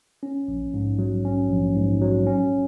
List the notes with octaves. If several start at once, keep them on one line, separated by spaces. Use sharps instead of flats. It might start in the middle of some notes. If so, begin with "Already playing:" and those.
C#4
A#1
G#2
F#3
C#4
A#1
G#2
F#3
C#4